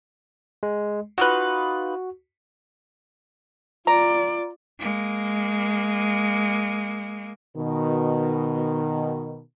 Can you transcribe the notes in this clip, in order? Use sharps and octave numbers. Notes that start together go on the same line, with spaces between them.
G#3
D#4 F4 F#4 B4
F4 D5 A#5
G#3 A#3
B2 D#3